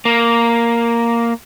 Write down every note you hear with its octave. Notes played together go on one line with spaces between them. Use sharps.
A#3